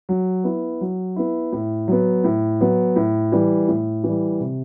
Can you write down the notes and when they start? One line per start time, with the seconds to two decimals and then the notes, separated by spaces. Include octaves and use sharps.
0.09 F#3
0.44 B3 E4
0.81 F#3
1.16 B3 E4
1.52 A2
1.88 F#3 B3
2.24 A2
2.61 F#3 B3
2.96 A2
3.32 E3 G3
3.68 A2
4.04 E3
4.09 G3
4.40 C3